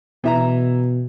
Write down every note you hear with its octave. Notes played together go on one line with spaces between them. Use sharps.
B2 E3 E5 A#5